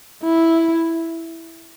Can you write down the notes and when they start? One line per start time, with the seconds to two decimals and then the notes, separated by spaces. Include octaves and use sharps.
0.23 E4